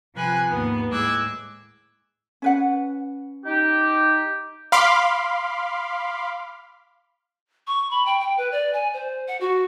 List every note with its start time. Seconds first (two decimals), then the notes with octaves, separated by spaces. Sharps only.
0.15 C3 F3 B4 G#5 F#6
0.49 D#2 G#2 B3
0.90 A2 G#3 D6 E6 F#6 G#6
2.42 C#4 B4 F#5
3.45 D#4 G4
4.72 F5 B5 C6 D6
7.67 C#6
7.91 B5
8.06 G5
8.20 G5
8.37 B4
8.52 D5
8.74 G#5
8.94 C5
9.28 F#5
9.41 F#4